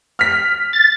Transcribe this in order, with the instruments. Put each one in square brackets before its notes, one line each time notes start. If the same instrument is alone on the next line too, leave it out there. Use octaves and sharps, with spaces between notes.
[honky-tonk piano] F6 B6
[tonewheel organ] A6